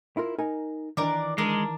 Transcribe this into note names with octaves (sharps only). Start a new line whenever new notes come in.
E4 F4 A#4
D#4 A#4 G#5
D#3 E3 D4 A#4 D5
G#3 D4 A#4